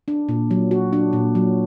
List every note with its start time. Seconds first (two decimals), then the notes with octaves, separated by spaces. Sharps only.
0.08 D4
0.29 A#2
0.51 F#3
0.71 F#4
0.93 D4
1.13 A#2
1.35 F#3